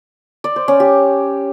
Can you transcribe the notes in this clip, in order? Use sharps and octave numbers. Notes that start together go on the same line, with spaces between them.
D5
C5
C#4
G4